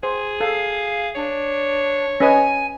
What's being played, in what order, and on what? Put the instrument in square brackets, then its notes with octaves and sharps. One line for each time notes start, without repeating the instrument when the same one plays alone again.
[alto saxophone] G#4 [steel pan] C5
[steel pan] A4 [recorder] F5
[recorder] D4 [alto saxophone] C#5
[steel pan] C#4 B4 D#5 [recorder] G#5